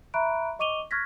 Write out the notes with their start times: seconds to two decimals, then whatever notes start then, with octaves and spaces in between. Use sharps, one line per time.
0.14 E5 A#5 B5 C#6 F#6 D7
0.59 D#5 C#6 D6 D#7 F7 G7
0.91 C#6 F6 F#6 G#6 A#6 B6